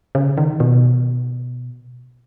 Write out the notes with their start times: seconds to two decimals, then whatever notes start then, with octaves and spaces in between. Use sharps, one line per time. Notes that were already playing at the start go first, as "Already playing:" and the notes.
0.15 C#3
0.37 D#3
0.60 B2